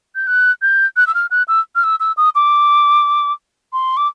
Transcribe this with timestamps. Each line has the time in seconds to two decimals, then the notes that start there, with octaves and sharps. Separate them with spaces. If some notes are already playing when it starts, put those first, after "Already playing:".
0.15 G6
0.27 F#6
0.62 G6
0.97 F#6
1.07 E6
1.14 F6
1.31 F#6
1.48 E6
1.75 F6
1.84 E6
2.00 E6
2.17 D#6
2.35 D6
3.73 C6
3.97 D6